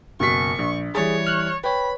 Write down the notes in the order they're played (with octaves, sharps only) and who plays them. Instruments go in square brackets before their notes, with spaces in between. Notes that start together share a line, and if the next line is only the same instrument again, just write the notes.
[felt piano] F#1 B2 B6 [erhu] C#6
[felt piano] A#1
[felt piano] E3 G3 A6 [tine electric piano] G#4 [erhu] C#5
[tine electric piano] F6 F#6
[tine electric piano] B4 C#5 [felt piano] G5 [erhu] B5